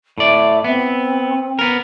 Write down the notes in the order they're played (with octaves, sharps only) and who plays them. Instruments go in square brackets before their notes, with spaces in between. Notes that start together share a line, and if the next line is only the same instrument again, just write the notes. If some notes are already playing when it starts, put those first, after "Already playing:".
[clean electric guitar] A2 D5 [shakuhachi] E5
[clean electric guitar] B3 [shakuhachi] C4
[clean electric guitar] B3 A#4